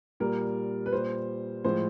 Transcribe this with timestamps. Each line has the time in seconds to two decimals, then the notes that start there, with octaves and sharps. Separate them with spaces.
0.20 A#2 G3 A#4
0.86 B4
0.92 A#2 G3 C5
1.64 A2 F3 G#3 C5